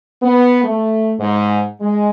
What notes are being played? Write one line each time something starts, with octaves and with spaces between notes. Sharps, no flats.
B3
A3
G#2
G#3